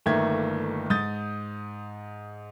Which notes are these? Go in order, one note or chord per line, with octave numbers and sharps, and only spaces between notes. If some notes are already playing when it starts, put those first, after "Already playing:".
G1 D#3 A3 A#3 E5 G#6
G#2 D#6 G6 A6